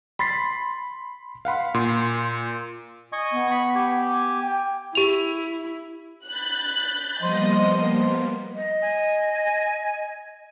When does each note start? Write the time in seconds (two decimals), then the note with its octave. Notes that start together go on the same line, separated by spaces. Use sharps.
0.19 B5 C6 A6 B6 C7
1.45 F5 F#5 B5 C6
1.74 A#2 C6
3.12 D#5 G#5 C#6
3.32 B3
3.51 B5 C#6
3.75 G4 G#5
4.43 G5
4.95 E4 G4 F7
6.27 B5 F#6 G6 A6
7.22 F3 G3 A#3 B3 C5 D#5 C6
8.54 D#5
8.82 G#5